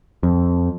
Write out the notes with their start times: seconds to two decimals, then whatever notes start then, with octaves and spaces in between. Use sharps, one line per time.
0.23 F2